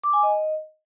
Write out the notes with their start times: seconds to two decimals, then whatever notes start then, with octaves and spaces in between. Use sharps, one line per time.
0.04 D6
0.13 G#5
0.23 D#5